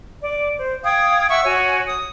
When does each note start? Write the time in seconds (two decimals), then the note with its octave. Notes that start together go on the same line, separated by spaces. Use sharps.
0.22 D5
0.57 C5
0.83 F5 G5 D#6 G#6
1.29 E5 F#5 C#6 E6
1.44 F#4 C#5 G#5
1.86 D#6